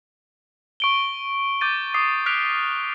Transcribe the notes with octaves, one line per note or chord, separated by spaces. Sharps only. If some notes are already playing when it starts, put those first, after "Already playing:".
C#6 D7 G7
D6 G6 A6 D#7
D6 D#6 C7
F6 F#6 B6 D7 F7